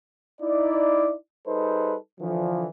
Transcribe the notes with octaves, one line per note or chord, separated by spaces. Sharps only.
D#4 E4 D5
G3 D#4 G#4 A4 B4 C5
D3 E3 F3